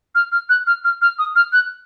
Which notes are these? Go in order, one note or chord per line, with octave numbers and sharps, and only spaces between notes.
F6
F6
F#6
F6
F6
F6
D#6
F6
F#6